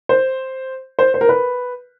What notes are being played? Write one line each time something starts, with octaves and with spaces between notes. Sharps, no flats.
C5
C5
C5
A#4
B4